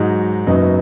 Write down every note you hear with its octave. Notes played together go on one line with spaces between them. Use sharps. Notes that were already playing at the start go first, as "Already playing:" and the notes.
Already playing: G#2 F#3 D#4 F#4
F#1 F#2 F#3 B3 D#4